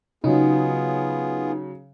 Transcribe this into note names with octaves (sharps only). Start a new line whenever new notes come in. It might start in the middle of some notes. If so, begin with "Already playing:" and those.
C#3 F#3 B3 D#4 F4 G#4